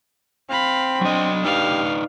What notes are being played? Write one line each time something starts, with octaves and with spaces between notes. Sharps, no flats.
C4 F5 B5
F#3 D4 D#5
D#4 G4 B4 D5 F5